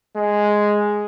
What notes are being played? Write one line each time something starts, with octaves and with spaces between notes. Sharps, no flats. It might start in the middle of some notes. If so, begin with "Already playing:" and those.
G#3